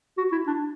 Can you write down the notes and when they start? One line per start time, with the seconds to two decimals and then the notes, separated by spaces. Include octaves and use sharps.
0.18 F#4
0.32 E4
0.47 D4